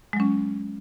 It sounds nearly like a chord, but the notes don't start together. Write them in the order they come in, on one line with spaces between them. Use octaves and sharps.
G#3 F#3 C#4